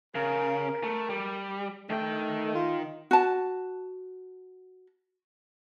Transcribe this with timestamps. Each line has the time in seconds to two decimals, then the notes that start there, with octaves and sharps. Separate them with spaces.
0.15 C#3 A#4
0.84 A3
1.10 G3
1.90 D#3 A3 G5
2.55 F4
3.11 F#4 A5